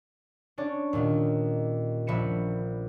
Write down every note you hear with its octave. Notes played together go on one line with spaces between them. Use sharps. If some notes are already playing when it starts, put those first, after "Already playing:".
C#4 D4 C#5 D5
D#2 A#2 D#3
A#1 E5 B5 C#7 E7